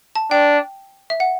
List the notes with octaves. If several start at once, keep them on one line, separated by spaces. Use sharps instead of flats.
A5
D4 G5
E5
F#5